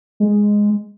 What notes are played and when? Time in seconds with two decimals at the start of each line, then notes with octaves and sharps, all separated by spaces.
0.20 G#3